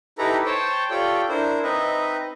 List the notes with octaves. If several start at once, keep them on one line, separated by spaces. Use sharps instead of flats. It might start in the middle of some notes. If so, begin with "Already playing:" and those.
D#4 E4 G4 A4 B4 A#5
C5 C#5 G5 A5
F4 G4 A4 C#5 D5 G5
D4 E4 A#4 C5
C4 D#4 B4 D#5 E5